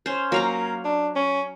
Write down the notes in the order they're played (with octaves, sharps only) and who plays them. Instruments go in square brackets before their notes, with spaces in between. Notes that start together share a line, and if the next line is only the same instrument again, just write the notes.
[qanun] C#4 C5
[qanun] F#3 F5 A#5 [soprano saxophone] A#3
[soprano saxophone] D4
C#4